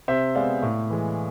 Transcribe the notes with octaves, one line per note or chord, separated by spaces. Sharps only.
C3 C5 E5
G#3 B3 D5 F5
A2
E3 G#3